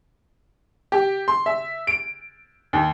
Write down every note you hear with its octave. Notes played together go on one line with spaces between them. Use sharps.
G4
C6
E5
D7
D#2